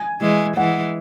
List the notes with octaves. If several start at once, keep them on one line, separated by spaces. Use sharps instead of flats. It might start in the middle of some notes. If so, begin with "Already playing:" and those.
Already playing: G#5
E3 G#3
E3 G#3 F#5